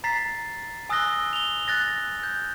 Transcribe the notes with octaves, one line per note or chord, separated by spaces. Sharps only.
A#5 A6 B6 C7
G#5 D#6 E6 F#6 A#6 G7
F7 G7
F#6 A6 A#6
G6